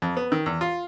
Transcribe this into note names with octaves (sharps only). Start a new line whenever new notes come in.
F2
B3
D#3
E2
F4